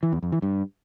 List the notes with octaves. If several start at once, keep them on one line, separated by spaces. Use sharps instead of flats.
E3
E2
F2
E3
G2